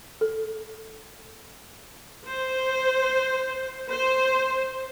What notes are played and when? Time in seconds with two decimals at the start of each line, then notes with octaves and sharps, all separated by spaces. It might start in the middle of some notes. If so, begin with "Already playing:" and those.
0.21 A4
2.27 C5
3.91 C5